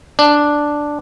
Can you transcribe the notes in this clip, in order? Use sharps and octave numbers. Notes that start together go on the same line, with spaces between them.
D4